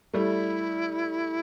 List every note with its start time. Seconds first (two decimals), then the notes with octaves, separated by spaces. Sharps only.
0.14 G3 A3 E4 G#4